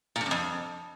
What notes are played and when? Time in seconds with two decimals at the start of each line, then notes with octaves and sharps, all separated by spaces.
0.16 A#2
0.21 G2
0.26 F#2
0.31 F2